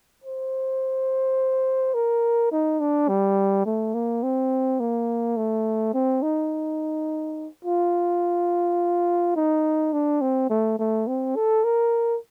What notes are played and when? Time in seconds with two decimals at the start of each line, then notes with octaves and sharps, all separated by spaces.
0.24 C5
1.95 A#4
2.52 D#4
2.80 D4
3.09 G3
3.66 A3
3.94 A#3
4.23 C4
4.80 A#3
5.37 A3
5.94 C4
6.22 D#4
7.65 F4
9.36 D#4
9.93 D4
10.21 C4
10.50 A3
10.79 A3
11.07 C4
11.36 A4
11.64 A#4